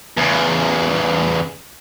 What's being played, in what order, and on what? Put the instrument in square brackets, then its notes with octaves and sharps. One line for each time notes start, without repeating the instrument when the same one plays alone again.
[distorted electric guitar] E2 C#3